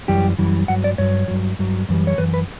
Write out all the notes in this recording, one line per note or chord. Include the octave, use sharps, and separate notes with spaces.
F#2 E3 G3 G4
F#2 E3 G3
G2 F#3 F#5
D5
G2 F#3 C#5
G2 F#3
G2 F#3
F#2 E3 G3
C#5
F#2 E3 B4
B4